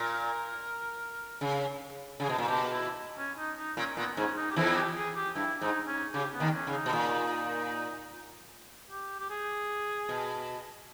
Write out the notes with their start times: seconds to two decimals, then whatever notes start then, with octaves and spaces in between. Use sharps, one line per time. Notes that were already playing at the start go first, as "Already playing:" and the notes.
Already playing: A#2 A#4
1.41 C#3
2.20 C#3 G#4
2.29 B2
2.38 A#2
2.46 B2 G4
2.72 E4
3.18 C#4
3.38 D#4
3.58 D#4
3.77 A#2 C#4
3.97 A#2 B3
4.17 G#2 C#4
4.37 D#4
4.51 G4
4.56 E2 E3 E4
4.75 G4
4.96 G#4
5.16 G4
5.35 G2 E4
5.61 G#2 D#4
5.87 C#4
6.14 C#3 G4
6.34 B3
6.40 D#2 D#3
6.54 C#4
6.67 C#3
6.73 D#4
6.86 B2
6.93 A#2
8.91 G4
9.20 G4
9.30 G#4
10.09 B2